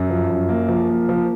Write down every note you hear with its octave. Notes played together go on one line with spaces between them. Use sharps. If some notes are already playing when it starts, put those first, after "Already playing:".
Already playing: F#2
F3
F#2
A#3
F3
A#3
F3